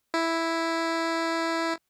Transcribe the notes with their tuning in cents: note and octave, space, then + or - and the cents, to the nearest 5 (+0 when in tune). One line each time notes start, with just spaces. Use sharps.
E4 +0